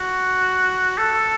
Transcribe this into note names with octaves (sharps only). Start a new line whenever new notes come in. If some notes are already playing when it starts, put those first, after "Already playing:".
Already playing: F#4
A4